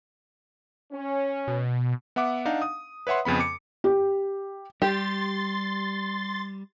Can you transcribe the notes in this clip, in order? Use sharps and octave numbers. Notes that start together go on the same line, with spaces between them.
C#4
B2
B3 E5 F#5 D6
D4 D#4 F5 F#5
D#6
B4 C#5 E5 F#5 C6
F2 C#3 B3 B5
D6 C#7
G4
G3 G4 C6 A6